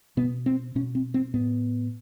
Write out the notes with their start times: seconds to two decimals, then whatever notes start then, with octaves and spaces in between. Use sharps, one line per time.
0.17 B2 B3
0.46 C4
0.75 B2 C#4
0.95 C4
1.14 C4
1.34 A2 B3